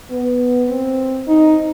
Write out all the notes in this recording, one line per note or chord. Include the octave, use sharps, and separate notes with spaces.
B3
C4
D#4